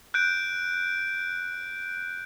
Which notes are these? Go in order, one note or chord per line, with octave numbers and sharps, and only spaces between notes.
F#6 G6 D7